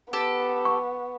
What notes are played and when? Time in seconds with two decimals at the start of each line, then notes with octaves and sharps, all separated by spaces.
0.13 B3 G4 A4 A5
0.65 C#6